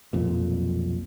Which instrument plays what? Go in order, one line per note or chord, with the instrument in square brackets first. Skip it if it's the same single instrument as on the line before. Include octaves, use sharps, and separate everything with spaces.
[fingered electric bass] B1 F2 A#2